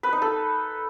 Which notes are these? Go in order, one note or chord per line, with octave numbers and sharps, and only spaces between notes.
B4
D#4
A4